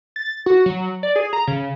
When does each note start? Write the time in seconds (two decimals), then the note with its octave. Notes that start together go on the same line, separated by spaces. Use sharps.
0.16 A6
0.46 F#4
0.66 F#3
1.03 D5
1.16 G#4
1.33 A#5
1.47 C#3